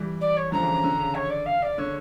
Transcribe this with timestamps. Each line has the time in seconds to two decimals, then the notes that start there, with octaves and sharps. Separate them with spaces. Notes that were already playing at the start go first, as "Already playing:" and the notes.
Already playing: E3 G3
0.21 D5
0.37 C#5
0.52 D3 F3 A#5
0.62 C#3 E3
0.73 C#3
0.83 D3
1.00 C#3
1.15 C#5
1.30 D5
1.46 F5
1.62 D5
1.78 D3 C#5